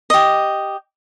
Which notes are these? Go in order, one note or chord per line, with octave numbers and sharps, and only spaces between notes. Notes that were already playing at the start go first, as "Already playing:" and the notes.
G4 D#5